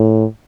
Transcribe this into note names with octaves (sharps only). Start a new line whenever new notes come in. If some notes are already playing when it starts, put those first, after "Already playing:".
Already playing: A2